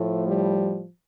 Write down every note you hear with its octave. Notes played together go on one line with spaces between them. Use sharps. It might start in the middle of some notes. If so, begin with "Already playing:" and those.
Already playing: A2 F3 A3
G3